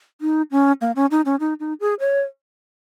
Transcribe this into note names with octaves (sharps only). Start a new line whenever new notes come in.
D#4
C#4
A#3
C#4
D#4
C#4
D#4
D#4
G#4
C#5